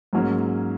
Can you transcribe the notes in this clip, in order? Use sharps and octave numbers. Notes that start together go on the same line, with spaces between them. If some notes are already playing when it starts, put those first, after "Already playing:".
G#2 F#3 A#3 C#4